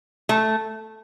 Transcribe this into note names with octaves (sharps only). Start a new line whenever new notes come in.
A3